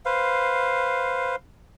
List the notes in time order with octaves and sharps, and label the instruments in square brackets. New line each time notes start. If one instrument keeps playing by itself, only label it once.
[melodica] B4 C5 F5